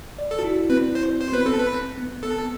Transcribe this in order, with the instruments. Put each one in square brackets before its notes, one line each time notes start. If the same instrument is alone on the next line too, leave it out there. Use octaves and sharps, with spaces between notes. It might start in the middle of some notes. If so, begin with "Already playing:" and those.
[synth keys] D5
[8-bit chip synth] A4
[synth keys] F#4
E4
[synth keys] C4 [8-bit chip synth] B4
[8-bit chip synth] C5
C5
[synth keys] B3 [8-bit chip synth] B4
[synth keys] C4 [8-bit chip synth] A4
[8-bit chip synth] B4
[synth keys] C4
B3
[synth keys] B3 [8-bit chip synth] A4
[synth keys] B3